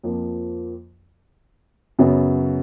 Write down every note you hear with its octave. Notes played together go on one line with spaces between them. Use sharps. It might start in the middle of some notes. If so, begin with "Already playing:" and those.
F2 F3 A#3
F#2 C#3 F#3 B3